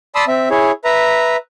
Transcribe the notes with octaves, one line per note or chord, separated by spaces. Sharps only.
D5 A5 B5 C6 D#6 E6
C4 E5
E4 G#4 C#5
B4 E5 A#5